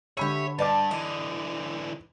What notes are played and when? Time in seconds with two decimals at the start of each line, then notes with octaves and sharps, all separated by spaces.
0.17 D3 G4 C#5 E5 B5 D#7
0.59 G2 B4 D5 A5 D6
0.91 D3 E3 D#5